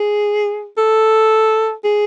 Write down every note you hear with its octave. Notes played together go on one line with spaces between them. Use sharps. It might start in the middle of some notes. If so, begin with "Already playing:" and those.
Already playing: G#4
A4
G#4